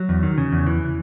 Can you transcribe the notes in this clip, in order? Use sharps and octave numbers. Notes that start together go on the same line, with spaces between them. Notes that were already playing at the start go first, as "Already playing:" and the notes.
Already playing: F#3
E2
D#3
C#3
E2
E3